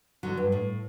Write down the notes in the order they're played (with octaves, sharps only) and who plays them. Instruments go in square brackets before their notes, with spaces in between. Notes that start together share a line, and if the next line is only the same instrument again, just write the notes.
[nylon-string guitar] D3 F#3
G2
A2